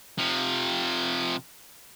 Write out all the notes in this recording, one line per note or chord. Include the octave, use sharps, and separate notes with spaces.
C3 F3